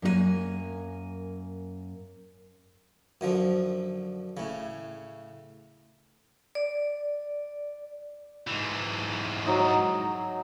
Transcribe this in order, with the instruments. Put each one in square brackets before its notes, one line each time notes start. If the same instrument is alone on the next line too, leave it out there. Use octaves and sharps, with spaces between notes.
[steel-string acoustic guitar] F#2 A#3 G#4 G#5
[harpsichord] F#2 D3 F3
A2 C#3
[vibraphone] D5
[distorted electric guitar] G#2 E3
[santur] F#3 D#4